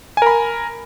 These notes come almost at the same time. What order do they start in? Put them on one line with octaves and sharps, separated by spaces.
G#5 A#4 B5